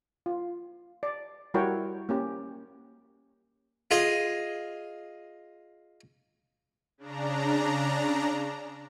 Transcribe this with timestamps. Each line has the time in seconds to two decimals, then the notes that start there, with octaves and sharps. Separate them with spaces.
0.26 F4
1.03 D5
1.54 G3 E4 F#4 A#4 C#5 G5
2.09 A#3 C#4 G4
3.91 F4 G#4 D#5
6.98 C#3 D4 A#5